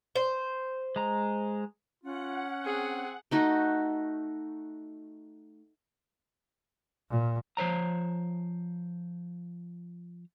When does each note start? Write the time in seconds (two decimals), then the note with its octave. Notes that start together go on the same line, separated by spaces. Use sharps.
0.16 C5
0.96 G#3 A#5
2.04 C#4 F4 F#5
2.65 C4 G#4
3.31 A3 D#4 F#4
7.10 A#2
7.57 F3 C5 C#5 A#5